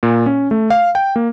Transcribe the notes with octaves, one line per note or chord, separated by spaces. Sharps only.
A#2
C#4
A3
F5
G5
A#3